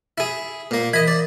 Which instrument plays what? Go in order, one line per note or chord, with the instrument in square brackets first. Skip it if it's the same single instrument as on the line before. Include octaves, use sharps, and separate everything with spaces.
[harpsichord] E4 G#4
A#2 A#3
[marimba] E3 A#4 E5 [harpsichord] D#5 B5
[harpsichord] D5